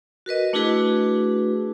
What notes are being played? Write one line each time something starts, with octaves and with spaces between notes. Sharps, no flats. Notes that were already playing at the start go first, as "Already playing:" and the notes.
F#4 A#4 B4 D#5
A3 D4 E4 F#4 G#4 B4